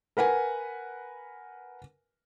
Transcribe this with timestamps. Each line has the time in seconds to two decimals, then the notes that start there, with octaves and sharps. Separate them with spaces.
0.17 A#4 B4 F#5 G#5